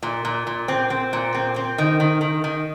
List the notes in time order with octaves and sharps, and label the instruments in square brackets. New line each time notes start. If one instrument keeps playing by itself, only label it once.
[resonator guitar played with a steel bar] A#2
A#2
A#2
C4
C4
A#2
C4
C4
D#3
D#3
D#3
D#3